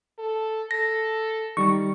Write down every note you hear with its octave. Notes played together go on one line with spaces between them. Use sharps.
A4
A4 A#6
D#3 G3 C#6